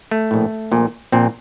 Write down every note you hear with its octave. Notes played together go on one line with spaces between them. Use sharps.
A3
A#1 A2
A#1 A#2
A#1 A#2 C4